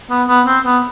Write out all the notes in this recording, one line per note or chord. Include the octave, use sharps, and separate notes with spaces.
B3
B3
C4
B3